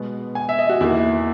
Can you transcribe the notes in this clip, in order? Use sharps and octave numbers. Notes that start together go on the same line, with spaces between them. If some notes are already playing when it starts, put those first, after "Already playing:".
Already playing: B2 G#3 B3
G#5
E5
D#5
F#4
E2 D#3 A#3 E4